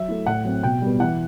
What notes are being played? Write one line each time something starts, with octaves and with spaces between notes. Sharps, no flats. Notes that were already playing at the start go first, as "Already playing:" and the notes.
Already playing: F#3 E5
A3 E4
A2 F#5
F#3 C4
B2 G5
G3 B3
E3 F#5